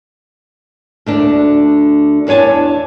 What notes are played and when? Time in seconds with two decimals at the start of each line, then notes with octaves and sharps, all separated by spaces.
1.06 D2 D3 D4
2.27 E2 D4 C#5 G#5 A5